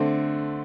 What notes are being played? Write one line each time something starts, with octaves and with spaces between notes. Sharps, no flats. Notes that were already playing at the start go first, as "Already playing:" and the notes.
Already playing: D3 A3 C4